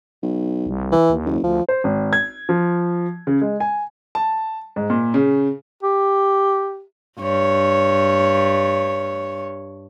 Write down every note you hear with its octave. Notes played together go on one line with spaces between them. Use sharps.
B1
C2
E3
D#2
F#1
D2 F3
C5
G#1
G#6
F3
C#3
G#3
G#5
A5
G#2
A#2
C#3
G4
G2 C#5